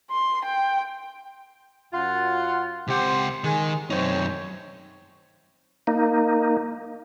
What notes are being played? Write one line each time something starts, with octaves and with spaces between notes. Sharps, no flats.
C6
G5
F#2 F4 F#5
C#2 C4 G4 F#5 C6
D#3 G#3
F#2 C4 D#4 C#5
A#3 D#4